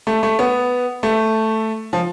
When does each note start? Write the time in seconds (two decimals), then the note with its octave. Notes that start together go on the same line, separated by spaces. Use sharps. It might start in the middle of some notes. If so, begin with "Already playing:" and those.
0.07 A3
0.23 A3
0.39 B3
1.03 A3
1.93 F3